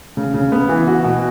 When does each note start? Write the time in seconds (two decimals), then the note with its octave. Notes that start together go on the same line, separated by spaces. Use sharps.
0.17 C#3
0.34 C#3
0.52 B3
0.69 E3
0.87 F#4
1.04 B2